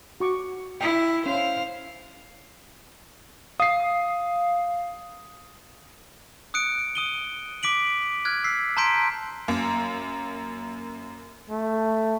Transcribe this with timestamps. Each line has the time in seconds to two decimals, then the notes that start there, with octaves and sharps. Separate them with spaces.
0.20 F#4 C#6 D6
0.81 E4 G5
1.26 C#4 C5 F5
3.60 F5 D#6 C7
6.54 D#6 F#6 C#7 D7
6.95 D#6 D#7 G7
7.63 D6 B6 D7 F#7
8.25 F6 F#6 G#6
8.44 E6 B6 C7
8.77 A5 A#5 C6 G6 B6 D7
9.48 F#2 A#3
11.50 A3